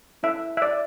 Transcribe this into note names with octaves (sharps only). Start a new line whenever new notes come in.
C#4 E4 A4 E5
E5
D5